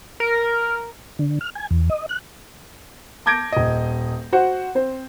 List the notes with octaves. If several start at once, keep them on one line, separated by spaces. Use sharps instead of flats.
A#4
D3
F6
G#5
E2
D#5
F#6
A5 D6 G6 G#6 A#6 D7
D#1 D#5
F#4 C5 F#5
C4 C5